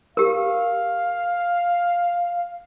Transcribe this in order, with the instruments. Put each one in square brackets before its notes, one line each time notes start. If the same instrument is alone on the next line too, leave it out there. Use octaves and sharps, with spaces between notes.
[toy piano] G4 A#4 [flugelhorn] F5